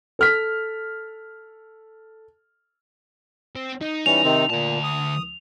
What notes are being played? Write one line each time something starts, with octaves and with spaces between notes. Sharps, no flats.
A4 F6 B6
C4
D#4
E3 G3 C#4 F7
C3 D#3 C4
D2 A#2 A5
D#6